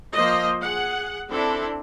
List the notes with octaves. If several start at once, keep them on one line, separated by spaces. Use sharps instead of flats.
F3 A#3 C5 D#5
G#4 F#5
C4 D4 E4 A4